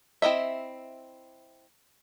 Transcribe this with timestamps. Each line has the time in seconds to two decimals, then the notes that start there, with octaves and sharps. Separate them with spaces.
0.22 C4 E4 D#5 E5